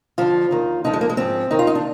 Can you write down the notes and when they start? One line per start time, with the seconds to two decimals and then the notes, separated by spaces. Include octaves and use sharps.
0.18 F2 D3 F3 F4
0.51 D#2 D#3
0.84 D2 D3 F3 D#4
0.93 G#3
1.01 A#3
1.10 G#3
1.17 G#2 F3 C4
1.51 D#2 D#3 D#4
1.59 F4
1.67 D#4
1.75 D4